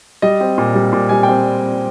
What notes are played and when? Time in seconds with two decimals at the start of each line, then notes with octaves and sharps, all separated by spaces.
0.22 G3 D#5
0.41 C4
0.58 A#2
0.75 G3
0.93 A#2
1.09 G3 G#5
1.23 G5
1.28 C4